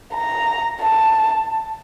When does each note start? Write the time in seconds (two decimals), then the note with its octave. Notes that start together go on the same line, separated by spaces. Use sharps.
0.14 A#5
0.81 A5